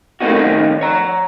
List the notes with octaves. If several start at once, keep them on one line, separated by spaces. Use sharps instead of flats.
A3 A#3 C4 D#4 F#4
A2 D#3 C#4 D#4
C#5 A#5